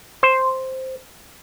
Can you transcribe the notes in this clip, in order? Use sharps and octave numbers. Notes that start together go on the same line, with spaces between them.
C5